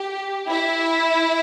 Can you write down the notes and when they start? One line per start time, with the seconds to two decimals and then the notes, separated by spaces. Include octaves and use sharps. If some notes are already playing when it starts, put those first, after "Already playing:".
Already playing: G4
0.50 E4